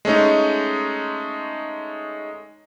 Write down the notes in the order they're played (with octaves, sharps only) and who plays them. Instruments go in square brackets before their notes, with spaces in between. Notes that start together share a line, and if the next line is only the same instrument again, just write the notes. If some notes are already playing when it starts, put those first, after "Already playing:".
[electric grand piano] G#3 A3 C#4 D#4